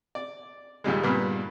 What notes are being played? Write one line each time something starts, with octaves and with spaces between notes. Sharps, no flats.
D5
D#2 A#2 G3 G#3
G2 A#2 A#3 B3